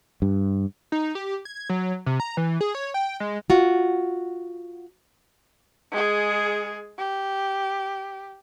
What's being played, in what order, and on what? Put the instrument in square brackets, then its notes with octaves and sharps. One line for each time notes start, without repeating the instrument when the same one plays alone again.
[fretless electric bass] G2
[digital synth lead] D#4
G4
G#6
F#3
C3
A#5
E3
G#4
C#5
G5
G#3
[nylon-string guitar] F4 F#4
[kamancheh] G#3 G#4
G4